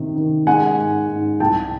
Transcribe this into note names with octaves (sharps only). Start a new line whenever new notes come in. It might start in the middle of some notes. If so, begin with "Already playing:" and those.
Already playing: C3 D#3
D#3
G#3 F#5 G#5
G#2
G#2
C2 G5 A5